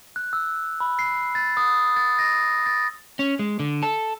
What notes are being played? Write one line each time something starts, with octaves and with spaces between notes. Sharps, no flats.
F#6
E6
B5
C7
A6
D#6
A6
A#6
A6
C#4
G#3
D3
A4